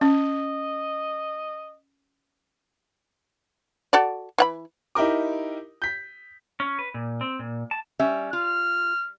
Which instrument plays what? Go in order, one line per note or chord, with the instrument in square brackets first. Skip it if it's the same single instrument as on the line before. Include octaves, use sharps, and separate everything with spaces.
[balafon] C#4 [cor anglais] D#5
[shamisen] F#4 A4 D5
E3 F#5 B5
[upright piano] D#4 E4 G4 A#4 D6
G6 B6
[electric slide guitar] C#4
B4
A#2
C4
A#2
A5
[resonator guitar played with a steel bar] G3 C#4 E5
[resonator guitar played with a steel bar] F4 [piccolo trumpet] F6